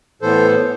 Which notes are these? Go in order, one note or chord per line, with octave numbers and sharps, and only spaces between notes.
A2 E3 B3 A4 C5